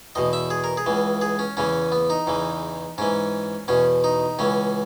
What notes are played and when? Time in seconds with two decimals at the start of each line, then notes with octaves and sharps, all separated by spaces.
0.15 E2 B2 D#5
0.33 E5
0.50 G#4
0.64 A#4
0.77 G#4
0.86 C#2 C#3 E3
1.21 G#4
1.39 C#4
1.57 E2 C#3 E3 C#4
1.92 B3
2.10 D#4
2.27 E2 C#3 E3
2.98 G#2 E3 C#4
3.68 E2 B2 C#4
4.04 D#4
4.39 C#2 C#3 E3 C#4